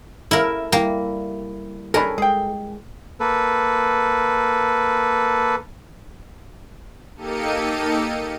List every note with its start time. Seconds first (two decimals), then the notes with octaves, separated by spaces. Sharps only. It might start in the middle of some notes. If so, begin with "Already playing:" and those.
0.31 A#3 E4 A4 A#4 E5
0.72 G3 A#3 E4 G4
1.94 C#4 D4 G4 A4 A#4 G#5 B5
2.18 G#3 G#4 G5
3.20 A#3 A4 B4
7.17 A#3 D#4 G4 A4 C#7 D#7